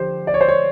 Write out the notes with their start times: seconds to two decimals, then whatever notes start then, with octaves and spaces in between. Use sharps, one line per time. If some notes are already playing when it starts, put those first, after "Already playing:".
Already playing: D3 F3 G4 C5
0.27 D5
0.34 C#5
0.41 C5
0.49 C#5